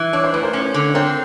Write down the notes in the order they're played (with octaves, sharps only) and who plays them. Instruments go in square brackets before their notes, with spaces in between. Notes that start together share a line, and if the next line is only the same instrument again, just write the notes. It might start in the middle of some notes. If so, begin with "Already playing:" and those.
Already playing: [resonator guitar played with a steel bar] E3
[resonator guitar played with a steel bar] D4 [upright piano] C#5
[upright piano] C5
[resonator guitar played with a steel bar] A2 [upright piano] B4
[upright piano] A#4 C5
[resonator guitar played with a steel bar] C#4
D3
[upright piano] C#5
[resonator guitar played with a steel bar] C4 [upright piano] A#4 C5